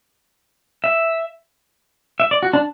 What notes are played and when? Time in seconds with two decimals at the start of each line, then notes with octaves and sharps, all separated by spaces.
0.84 E5
2.20 E5
2.31 D5
2.43 F#4
2.53 D4